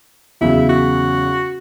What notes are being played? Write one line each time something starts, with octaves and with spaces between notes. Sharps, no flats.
E2 C#3 F#3 E4
F#4